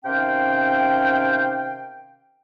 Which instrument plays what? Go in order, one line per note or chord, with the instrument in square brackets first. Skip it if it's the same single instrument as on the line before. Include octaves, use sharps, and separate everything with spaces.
[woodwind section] C3 D#3 C#4 F5 G5